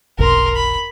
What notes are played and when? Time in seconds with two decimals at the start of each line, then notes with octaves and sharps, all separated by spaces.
0.19 F1 B1 A#4 C6
0.56 B5